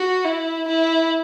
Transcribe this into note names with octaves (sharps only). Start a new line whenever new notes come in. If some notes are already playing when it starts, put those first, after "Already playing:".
Already playing: F#4
E4
E4